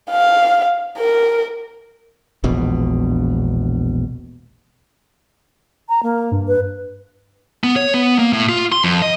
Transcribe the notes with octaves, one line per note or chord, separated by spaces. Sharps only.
F5
A#4
E1 A#1 B2
A#5
A#3
G2
B4
B3
C#5
B3
A#3
A2
F4
C6
F2
D#5